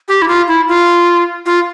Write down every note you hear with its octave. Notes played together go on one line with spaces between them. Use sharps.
G4
E4
F4
E4
F4
F4